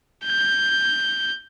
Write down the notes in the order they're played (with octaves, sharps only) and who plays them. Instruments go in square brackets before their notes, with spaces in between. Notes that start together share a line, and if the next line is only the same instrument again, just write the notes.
[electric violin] G6